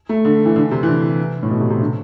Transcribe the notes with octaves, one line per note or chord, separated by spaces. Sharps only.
A3
D3
E3
D3
C3
E3
D3
A2
B2
C3
C3
D3